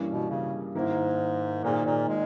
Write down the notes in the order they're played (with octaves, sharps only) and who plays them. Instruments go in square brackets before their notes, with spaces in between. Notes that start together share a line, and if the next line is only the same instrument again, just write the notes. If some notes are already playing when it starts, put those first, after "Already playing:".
Already playing: [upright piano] G2 E3 G3 A#3 C#4
[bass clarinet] B2
C#3
[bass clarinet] G#2 [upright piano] D#3 A#3 E4 A#4
[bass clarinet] A#2 [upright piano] D#3 A#3 D#4 G#4
[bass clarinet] A#2
G#3